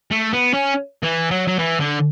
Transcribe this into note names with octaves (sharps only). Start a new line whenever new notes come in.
A3
B3
C#4
E3
F#3
F#3
E3
D3